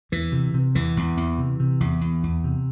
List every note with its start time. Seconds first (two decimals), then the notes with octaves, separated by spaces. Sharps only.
0.12 E2 E3
0.32 C3
0.54 C3
0.75 E2 E3
0.97 E2
1.17 E2
1.38 C3
1.60 C3
1.80 E2
2.01 E2
2.23 E2
2.44 C3